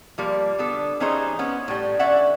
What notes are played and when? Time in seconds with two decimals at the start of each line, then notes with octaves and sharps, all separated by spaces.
0.18 F3 G3 A#3
0.59 D3 B3 A4
1.00 E3 G3 C#4 D#4 G#4 C5
1.39 B3 C#4
1.68 A2 G3
1.99 D3 C#4 D5 E5 F#5